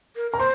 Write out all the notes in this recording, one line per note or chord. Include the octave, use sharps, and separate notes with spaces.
A#4
A#4 A#5
C5 C6